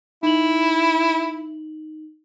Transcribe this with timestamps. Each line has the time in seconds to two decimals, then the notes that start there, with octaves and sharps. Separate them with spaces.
0.23 D#4 E4 F#7